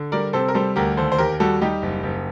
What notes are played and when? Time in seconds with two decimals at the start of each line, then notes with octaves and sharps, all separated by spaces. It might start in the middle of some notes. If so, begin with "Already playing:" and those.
Already playing: D3
0.12 G3 A#4 D5
0.33 C3 A4 C5
0.48 A#4
0.54 G3 A4 C5
0.76 D2 G4 A#4
0.97 D#2 A4 C5
1.12 C5
1.18 D#2 G4 A#4
1.40 G3 F#4 A4
1.61 G3 D#4 G4
1.82 F#1
2.03 F#1